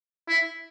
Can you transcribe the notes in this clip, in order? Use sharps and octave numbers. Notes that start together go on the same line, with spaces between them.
E4